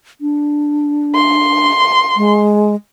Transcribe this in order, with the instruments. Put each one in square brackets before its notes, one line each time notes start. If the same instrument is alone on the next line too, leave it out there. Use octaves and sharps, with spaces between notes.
[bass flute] D4
[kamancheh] C6
[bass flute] G#3